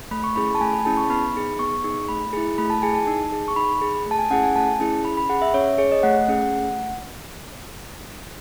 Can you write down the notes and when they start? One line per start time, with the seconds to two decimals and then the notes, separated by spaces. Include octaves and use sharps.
0.11 A3 B5
0.24 C#6
0.36 C#4 E4 G#4 B5
0.55 A5
0.61 A3 G#5
0.74 B5
0.85 C#4 E4 G#4 A5
0.97 C#6
1.10 B3 B5
1.34 D#4 G#4
1.59 B3 C#6
1.84 D#4 G#4
2.09 A3 B5
2.33 E4 G#4
2.58 A3 B5
2.70 A5
2.82 E4 G#4 G#5
2.94 A5
3.07 D#4
3.32 G#4
3.48 C#6
3.56 D#4 B5
3.81 G#4
4.06 A3 A5
4.18 G#5
4.30 C#4 E4 G#4 F#5
4.43 G#5
4.55 A3 A5
4.80 C#4 E4 G#4
5.05 C#4 B5
5.17 B5
5.29 G#4 F#5
5.42 E5
5.54 C#4 C#5
5.78 G#4 C#5
5.92 D#5
6.03 A3 F#5
6.28 C#4 G#4
6.52 A3